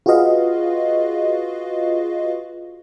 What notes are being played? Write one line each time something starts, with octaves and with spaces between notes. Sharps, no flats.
F4 F#4 G#4 B4 D#5 F5